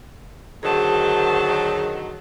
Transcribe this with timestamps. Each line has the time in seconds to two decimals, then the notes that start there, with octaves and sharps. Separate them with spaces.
0.63 D3 D#3 F#3 G#4 C5 A5